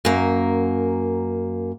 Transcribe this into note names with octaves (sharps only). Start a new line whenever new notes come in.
F#2 A#3